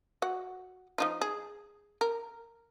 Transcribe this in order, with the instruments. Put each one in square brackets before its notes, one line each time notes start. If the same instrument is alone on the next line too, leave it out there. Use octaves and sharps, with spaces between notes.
[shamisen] F#4 F#5
F3 D#4 F4
G#4
A#4